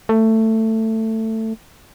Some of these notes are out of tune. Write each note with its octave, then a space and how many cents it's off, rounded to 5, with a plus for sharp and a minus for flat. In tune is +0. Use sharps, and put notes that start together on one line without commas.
A3 +15